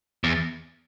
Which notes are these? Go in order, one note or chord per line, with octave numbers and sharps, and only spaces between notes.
E2